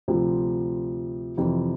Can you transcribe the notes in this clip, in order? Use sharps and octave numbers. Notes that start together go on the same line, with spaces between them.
D2 C3 F3
F2 C3 E3